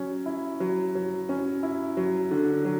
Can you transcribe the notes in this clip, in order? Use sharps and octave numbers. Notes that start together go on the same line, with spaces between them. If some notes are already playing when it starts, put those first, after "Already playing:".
Already playing: F#3 C#4
E4
F#3
F#3
C#4
E4
F#3
D3
F#3